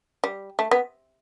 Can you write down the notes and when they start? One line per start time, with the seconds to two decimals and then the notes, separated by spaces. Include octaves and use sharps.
0.24 G3
0.59 A3
0.71 B3